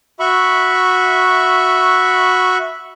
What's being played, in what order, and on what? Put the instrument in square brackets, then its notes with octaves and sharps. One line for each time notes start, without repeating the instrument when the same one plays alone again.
[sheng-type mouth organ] F#4 E5 B5 C#6